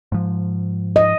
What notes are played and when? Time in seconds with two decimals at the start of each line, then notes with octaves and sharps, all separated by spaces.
0.12 G#2 F3
0.96 D#5